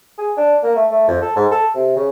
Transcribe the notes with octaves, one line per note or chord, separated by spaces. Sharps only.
G#4
D4
A#3
A3
A3
F2
A4
G#2
A4
C3
C#3